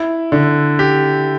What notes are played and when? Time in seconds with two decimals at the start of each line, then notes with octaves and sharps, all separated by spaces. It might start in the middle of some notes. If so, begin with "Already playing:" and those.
Already playing: E4
0.32 D3
0.79 G4